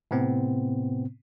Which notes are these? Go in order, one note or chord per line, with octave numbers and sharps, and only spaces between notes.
A2 C3 B3 C4